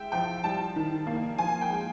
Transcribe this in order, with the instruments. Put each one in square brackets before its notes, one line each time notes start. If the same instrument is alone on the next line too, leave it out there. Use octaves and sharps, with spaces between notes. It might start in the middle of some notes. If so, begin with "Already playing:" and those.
Already playing: [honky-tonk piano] G#3 E5 G5
F3 G5
G3 A5
D#3
A#3
F3 G#5
G5
G#3